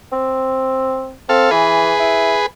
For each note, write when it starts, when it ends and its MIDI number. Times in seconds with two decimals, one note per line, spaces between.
0.12 1.12 60
1.29 1.50 60
1.29 1.51 69
1.29 1.51 77
1.51 1.93 52
1.51 2.46 68
1.51 2.46 71
1.99 2.36 64